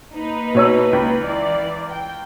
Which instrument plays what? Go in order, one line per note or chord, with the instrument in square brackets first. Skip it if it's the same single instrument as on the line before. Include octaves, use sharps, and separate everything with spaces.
[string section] A#3 D#4 B4
[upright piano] B2 C#5 E6
C#2
[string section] E3 D5
G5